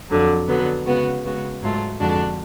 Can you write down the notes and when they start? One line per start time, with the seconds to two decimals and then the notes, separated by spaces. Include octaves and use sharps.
0.10 F2 D3 F#3
0.48 D3 F#3 B3
0.85 C#3 G#3 B3 F#4
1.24 C#3 G#3 B3 F#4
1.62 G#2 F#3 A3 F4
1.99 F2 D3 G#3 D4 F#4